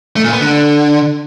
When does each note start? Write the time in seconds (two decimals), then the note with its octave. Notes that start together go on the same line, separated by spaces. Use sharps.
0.16 A3
0.24 A#2
0.32 B3
0.40 D3